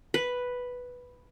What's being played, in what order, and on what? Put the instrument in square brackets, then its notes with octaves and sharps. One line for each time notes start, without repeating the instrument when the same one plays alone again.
[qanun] B4